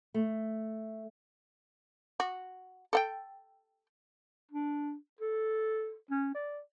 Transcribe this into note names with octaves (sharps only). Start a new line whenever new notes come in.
A3
F#4
A4 F#5 G5
D4
A4
C#4
D5